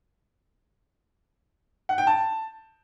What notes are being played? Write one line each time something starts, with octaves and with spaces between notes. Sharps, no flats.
F#5
G5
A5